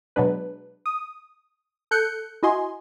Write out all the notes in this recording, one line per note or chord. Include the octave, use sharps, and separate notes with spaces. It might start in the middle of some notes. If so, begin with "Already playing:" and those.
B2 F#3 G#3 D4 B4
D#6
A4 F#6 G6 C#7
E4 F#4 D#5 G#5 C6